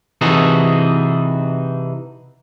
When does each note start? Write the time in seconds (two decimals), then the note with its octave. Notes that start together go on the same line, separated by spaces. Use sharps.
0.21 C3 E3 D#4 F#4 G#4 A4